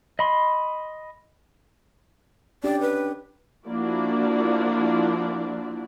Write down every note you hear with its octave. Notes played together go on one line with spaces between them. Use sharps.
D#5 B5 C6
C#4 D4 G4 D5
B4
F3 A#3 D4 E4 F#4 D5